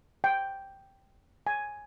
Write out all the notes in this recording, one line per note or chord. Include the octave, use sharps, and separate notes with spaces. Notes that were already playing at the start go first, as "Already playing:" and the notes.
G5
G#5